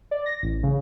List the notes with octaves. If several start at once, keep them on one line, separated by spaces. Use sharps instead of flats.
D5
A#6
A1
C#3